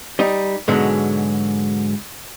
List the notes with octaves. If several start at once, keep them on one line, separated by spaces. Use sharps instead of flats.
G3 D#4
G#2 B2 D3 F#3 G#3